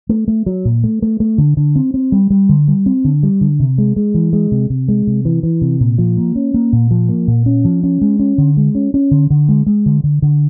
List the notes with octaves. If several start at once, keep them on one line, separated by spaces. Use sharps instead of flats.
A3
A3
F#3
A#2
A3
A3
A3
D3
D3
C4
C4
G3
G3
D3
G3
C4
D3
G3
D3
C3
G#3
G#3
E3
G#3
C3
C3
G#3
C3
E3
E3
C3
A#2
F3
A#3
C#4
A#3
A#2
F3
A#3
A#2
C#4
F3
C#4
G#3
C#4
D3
G#3
C#4
C#4
D3
D3
G#3
G#3
D3
D3
D3